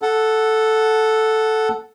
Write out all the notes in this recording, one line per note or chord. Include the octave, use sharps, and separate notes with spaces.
A4 F#5